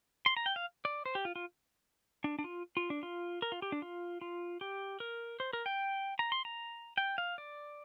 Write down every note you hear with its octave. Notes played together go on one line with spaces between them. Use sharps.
C6
A#5
G5
F5
D5
C5
G4
F4
F4
D4
D4
F4
F4
D4
F4
A#4
F4
G4
D4
F4
F4
G4
A#4
C5
A#4
G5
A#5
C6
A#5
G5
F5
D5